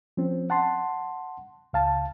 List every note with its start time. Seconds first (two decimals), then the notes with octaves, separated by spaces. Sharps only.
0.17 F3 C4 C#4
0.50 F#5 A5 C6
1.73 C#2 F5 A5